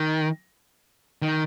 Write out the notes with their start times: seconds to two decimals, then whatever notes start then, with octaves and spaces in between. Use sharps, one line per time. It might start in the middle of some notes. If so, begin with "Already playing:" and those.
Already playing: D#3
1.22 D#3